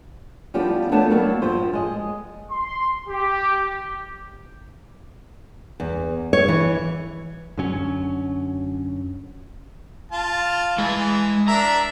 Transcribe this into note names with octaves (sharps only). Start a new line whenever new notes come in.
F3 G3 B3 D4 G4
A3 B3 D4 C#5 A5
F#3 G3 A#3 B3 F#4
G2 F3 C5
G#3 D#5
C6
G4
E2
C#5
E3
F#2 D3 F#3 C#4
F4 A5
E3 G#3 G#4
D4 A#4 E5 A#5